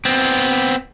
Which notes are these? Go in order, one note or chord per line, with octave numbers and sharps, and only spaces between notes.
B3 C4